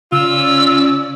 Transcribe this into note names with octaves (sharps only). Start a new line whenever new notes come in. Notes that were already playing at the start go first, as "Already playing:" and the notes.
C#3 C#4 F4 D5 E6